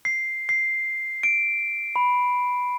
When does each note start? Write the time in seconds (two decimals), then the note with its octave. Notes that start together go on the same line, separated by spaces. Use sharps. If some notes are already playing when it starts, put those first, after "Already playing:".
0.05 C7
0.49 C7
1.23 D7
1.96 B5